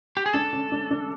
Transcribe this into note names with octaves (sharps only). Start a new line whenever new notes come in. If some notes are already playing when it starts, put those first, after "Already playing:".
G4
G#4
D4 A4
C#4
D4
D4